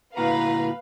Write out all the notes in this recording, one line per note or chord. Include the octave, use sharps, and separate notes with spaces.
D2 A#2 E4 F#4 B4 F5 A#5